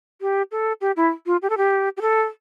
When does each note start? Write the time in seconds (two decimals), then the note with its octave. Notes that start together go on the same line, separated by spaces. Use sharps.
0.21 G4
0.52 A4
0.81 G4
0.97 E4
1.26 F4
1.42 G4
1.50 A4
1.58 G4
1.97 G4
2.02 A4